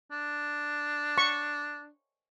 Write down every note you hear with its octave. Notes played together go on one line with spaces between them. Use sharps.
D4
C#6